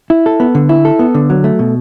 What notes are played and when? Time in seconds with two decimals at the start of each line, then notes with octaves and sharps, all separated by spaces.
0.10 E4
0.26 A4
0.40 B3
0.55 D3
0.69 E4
0.85 A4
0.99 B3
1.14 D3
1.30 F#3
1.44 A3
1.59 B2